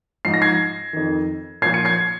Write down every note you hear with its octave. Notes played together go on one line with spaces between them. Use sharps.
G#2 F3 C7
A#6
G#6 C7
F2 D#3
A#2 F3 G#6 C7
C#7
G#6 C7